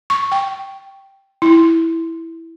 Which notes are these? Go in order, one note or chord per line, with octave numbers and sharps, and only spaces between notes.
C#6
G5
E4